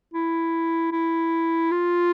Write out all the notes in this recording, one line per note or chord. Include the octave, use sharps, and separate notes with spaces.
E4
E4
F4